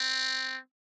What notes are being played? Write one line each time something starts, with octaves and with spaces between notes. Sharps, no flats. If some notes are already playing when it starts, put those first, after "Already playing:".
Already playing: C4